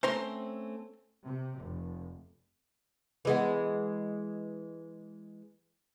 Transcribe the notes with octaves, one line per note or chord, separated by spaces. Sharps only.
A3 C4 C#4 C5 A#5 C6
C3
F1
E3 G#3 B3